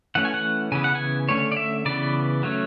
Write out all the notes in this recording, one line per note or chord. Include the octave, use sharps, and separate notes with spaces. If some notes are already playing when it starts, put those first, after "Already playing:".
E3 A3 C#4 F#5
G#5
F#5
C#3 E3 B3 G#5
F#5
G#5
D3 A3 C#4 C#5
D5
E5
C#3 E3 B3 D5
F#3 A3 C#4